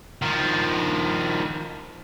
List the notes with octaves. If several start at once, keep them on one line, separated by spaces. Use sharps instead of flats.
D#3 F3